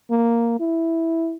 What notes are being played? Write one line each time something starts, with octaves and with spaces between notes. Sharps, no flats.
A#3
E4